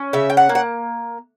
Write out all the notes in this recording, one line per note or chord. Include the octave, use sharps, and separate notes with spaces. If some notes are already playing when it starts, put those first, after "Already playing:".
Already playing: C#4
C#3 E5
G5
F#5
A#3
F#5